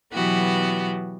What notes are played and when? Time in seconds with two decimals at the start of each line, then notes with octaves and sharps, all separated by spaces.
0.13 B2 E3 F#3 B3 F#4 G4